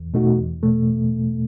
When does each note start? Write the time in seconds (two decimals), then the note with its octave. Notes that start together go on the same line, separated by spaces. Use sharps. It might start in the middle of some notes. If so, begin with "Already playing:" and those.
Already playing: E2
0.14 B2 A3 D#4 F#4
0.38 E2
0.63 B2 A3